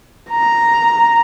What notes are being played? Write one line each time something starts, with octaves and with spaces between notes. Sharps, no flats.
A#5